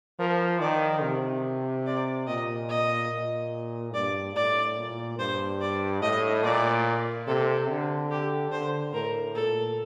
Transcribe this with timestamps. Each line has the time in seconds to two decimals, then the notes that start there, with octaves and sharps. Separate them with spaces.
0.19 F3 A#4
0.61 D#3 D5
1.03 C3
1.86 D5
2.27 A#2 D#5
2.69 D#5
3.11 A#2
3.94 G2 D5
4.36 A2 D5
4.78 A#2
5.19 G2 C5
5.61 D5
6.02 A2 D#5
6.43 A#2 D5
7.27 C3 A4
7.69 D3
8.11 G4
8.52 D3 C5
8.93 A2 A#4
9.35 A#2 A4